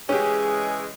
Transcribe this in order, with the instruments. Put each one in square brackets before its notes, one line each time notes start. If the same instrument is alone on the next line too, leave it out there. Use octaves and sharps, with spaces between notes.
[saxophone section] C#3 E3 G#3 [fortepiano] C#4 G4 [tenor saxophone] G#4